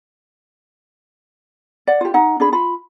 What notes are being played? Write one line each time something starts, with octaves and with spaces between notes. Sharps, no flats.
D5 F#5
F4 G4
D#4 F#5
D4 G#4 B5
F4 B5